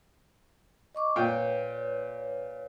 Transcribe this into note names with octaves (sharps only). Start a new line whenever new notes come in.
D#5 C#6 D6
A#2 B4 C#5 G5